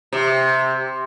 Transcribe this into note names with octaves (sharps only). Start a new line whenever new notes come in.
C3